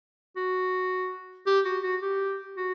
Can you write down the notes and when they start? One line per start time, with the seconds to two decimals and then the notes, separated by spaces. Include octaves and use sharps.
0.36 F#4
1.47 G4
1.65 F#4
1.83 F#4
2.02 G4
2.57 F#4